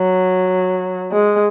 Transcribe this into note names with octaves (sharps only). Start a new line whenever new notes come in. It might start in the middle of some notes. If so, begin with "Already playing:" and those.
Already playing: F#3
G#3